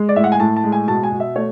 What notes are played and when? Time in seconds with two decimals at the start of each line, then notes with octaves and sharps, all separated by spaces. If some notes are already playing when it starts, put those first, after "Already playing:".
Already playing: G#3
0.09 D5
0.16 A2 E5
0.24 F#5
0.32 G#5
0.39 A2 A5
0.56 A5
0.64 G#3
0.72 G#5
0.88 B2 A5
1.03 G#5
1.12 B2
1.20 E5
1.36 A3 C#5